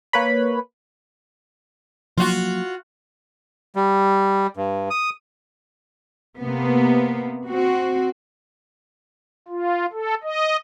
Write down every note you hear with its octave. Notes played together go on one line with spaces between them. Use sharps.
A#3 B4 C#5 B5
F3 F#3 A#3 F4 F#4
G3
G2
D#6
C3 A#3 B3
C4 F#4
F4
A4
D#5